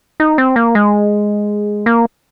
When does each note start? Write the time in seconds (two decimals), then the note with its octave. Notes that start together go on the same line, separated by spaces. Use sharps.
0.20 D#4
0.38 C4
0.56 A#3
0.75 G#3
1.86 A#3